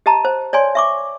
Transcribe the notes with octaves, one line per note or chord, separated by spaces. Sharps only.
G4 D#5 A5 A#5
C5
C#5 D5 G#5 C6
E5 C#6 D6